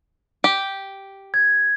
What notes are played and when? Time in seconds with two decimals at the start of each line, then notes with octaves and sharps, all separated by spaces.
0.44 G4
1.34 G#6